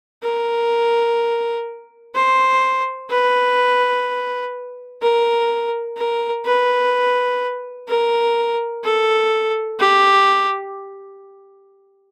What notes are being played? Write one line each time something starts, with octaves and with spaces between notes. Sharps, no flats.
A#4
C5
B4
A#4
A#4
B4
A#4
A4
G4